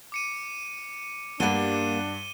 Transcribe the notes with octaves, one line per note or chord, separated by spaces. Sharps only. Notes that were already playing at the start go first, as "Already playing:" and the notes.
D6 C#7 D#7
G2 G3 A#3 D4 F#5 D#7 G7